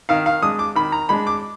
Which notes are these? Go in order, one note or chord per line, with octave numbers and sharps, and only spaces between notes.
D#3 F5
F5
G#3 D4 D#6
D6
D#3 B5
A#5
G#3 D4 B5
D6